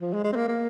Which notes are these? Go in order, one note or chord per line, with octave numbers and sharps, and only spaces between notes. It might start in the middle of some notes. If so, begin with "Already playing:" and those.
F3
G#3
G#3
C4
A#3
A#3